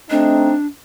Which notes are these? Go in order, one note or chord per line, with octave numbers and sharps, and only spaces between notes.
A3 C4 D4 D#4